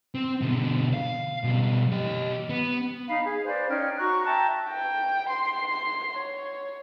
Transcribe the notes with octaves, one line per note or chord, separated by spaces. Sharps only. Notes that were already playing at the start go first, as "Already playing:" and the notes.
C4
B2 D3
F5
B2 G3
G4 D#5
B3
D#4 F5 B5
G#4
B4 C5 D5 F5
C#4 D#4 G5 F6
F#4 A#5 C#6 F#6
E5 G5 A5 A#5
G5
C6
C#5